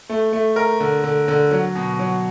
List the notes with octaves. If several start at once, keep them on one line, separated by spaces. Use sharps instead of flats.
A3
A3
A#4
D3
D3
D3
F#3
B2
F#3